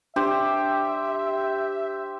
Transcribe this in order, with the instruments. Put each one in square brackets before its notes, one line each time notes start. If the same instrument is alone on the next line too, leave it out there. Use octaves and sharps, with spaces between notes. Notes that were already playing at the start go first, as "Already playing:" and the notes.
[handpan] D4 [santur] G4 C5 [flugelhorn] E5